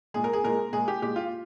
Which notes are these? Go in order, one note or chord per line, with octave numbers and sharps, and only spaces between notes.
A#2 G#3 G#4
A#4
G#4
A#2 G#3 A#4
A#2 G#3 G#4
G4
A#2 G#3 G4
F4